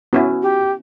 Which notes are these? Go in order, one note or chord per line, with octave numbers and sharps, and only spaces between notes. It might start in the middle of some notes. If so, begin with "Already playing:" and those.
B3 C#4 E4 F#4
G4